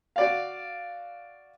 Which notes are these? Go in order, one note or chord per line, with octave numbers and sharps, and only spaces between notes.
F#4 D5 F5